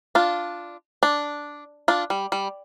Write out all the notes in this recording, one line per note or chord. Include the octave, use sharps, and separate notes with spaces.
D4 F4
D4
D4 F4
G3
G3